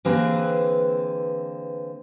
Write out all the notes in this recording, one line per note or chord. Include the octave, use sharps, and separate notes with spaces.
D3 E3 A#3 C4 G#4 B4